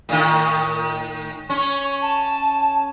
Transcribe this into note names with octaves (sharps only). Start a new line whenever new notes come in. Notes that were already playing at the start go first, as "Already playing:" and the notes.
A2 D#3
C#4 C#6
A5